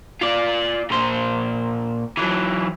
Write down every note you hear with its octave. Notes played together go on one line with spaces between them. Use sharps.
F4 D5
A#2 C5
E3 F#3